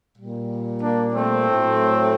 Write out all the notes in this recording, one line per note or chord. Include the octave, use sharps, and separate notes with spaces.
A#2 G3
A#3 D4
A3 C4
A2 F#3